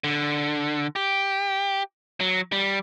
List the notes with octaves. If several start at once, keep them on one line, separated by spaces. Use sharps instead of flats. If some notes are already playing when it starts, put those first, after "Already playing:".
D3
G4
F#3
G3